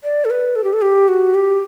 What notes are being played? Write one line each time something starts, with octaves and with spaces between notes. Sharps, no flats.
D5
A4
B4
A4
G4
A4
G4
F#4
G4